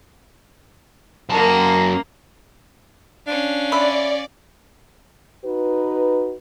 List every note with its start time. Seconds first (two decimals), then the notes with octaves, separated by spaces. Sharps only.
1.30 F#2 A#3 A#4 A5
3.27 C#4 D4 F5
3.72 D5 E5 B5 C6
5.44 D#4 F#4 B4